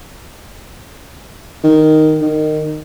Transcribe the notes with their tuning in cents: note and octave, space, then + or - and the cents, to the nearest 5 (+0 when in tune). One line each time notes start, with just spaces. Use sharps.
D#3 +0
D#3 -20